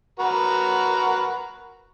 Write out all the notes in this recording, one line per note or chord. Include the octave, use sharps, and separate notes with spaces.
F#4 A#4 B4